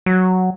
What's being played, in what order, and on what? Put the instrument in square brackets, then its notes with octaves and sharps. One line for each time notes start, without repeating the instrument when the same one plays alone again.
[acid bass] F#3